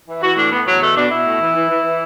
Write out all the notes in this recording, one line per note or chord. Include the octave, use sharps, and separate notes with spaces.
E3
E3 F#4
A2 D4
A2 B3
E2 F#3
B2 A3
B2 D4
B2 E4
A2
E3
E3
E3
E3